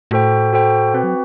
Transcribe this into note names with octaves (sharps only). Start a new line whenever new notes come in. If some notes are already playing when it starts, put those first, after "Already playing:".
A2 F#4 A4 C5 G5
F#4 A4 C5 G5
B2 C4 F#4 B4
F#3